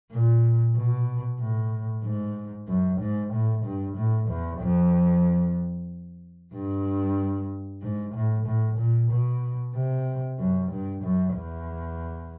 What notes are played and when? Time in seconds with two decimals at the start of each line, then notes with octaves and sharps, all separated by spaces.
0.12 A#2
0.75 B2
1.40 A2
2.03 G#2
2.68 F#2
3.00 G#2
3.33 A2
3.64 G2
3.96 A2
4.29 E2
4.61 F2
6.53 G2
7.82 G#2
8.14 A2
8.46 A2
8.78 A#2
9.11 B2
9.74 C3
10.38 F#2
10.71 G2
11.03 F#2
11.34 E2